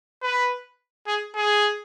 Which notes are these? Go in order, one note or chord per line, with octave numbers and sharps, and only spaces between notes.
B4
G#4
G#4